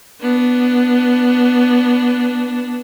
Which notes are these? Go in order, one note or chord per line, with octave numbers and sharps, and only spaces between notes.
B3 D4